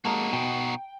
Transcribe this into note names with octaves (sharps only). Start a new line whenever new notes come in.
G#3 A#3 D#4 F#4 A5 A#5
B2 G5